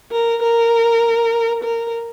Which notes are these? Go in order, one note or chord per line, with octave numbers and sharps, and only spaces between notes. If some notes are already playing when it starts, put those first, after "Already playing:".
A#4
A#4
A#4